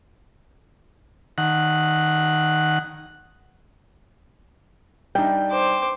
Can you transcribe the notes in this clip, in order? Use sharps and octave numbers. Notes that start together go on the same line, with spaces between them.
D#3 F#5
G3 D4 D#4 G5
C5 D6